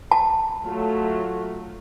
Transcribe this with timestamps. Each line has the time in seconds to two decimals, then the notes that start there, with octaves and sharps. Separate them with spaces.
0.11 A5
0.64 F#3 A3 F4